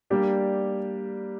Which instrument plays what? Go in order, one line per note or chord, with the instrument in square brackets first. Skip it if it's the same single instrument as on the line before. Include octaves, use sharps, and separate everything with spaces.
[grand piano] G3 A#3 D4 G4